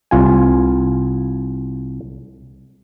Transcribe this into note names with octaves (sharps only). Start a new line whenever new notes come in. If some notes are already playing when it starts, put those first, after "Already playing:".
C2 F4 G#5